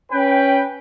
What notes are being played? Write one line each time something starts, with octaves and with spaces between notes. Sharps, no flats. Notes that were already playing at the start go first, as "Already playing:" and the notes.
C#4 B4 G5